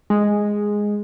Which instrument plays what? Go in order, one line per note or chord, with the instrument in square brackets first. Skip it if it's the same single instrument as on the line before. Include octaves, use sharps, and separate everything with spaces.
[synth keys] G#3